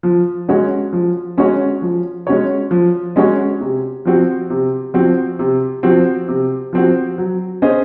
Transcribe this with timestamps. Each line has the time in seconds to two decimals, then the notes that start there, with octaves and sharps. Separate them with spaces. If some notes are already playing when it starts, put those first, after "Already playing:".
0.03 F3
0.48 G#3 C#4 F#4 C#5
0.93 F3
1.37 G#3 C#4 F#4 C#5
1.82 F3
2.27 G#3 C#4 F#4 C#5
2.71 F3
3.16 G#3 C#4 F#4 C#5
3.60 C3
4.05 F3 C4 F#4
4.50 C3
4.94 F3 C4 F#4
5.39 C3
5.83 F3 C4 F#4
6.28 C3
6.73 F3 C4 F#4
7.18 F#3
7.62 C#4 G#4 C5 D#5